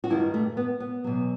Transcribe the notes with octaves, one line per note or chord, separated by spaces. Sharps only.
F#4
G2 D#3 G3 E4
A3
B3
B3
E2 B2 F#3